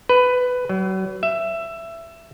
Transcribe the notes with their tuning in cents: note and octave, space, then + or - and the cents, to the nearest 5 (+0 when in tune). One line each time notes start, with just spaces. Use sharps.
B4 +15
F#3 +35
E5 +15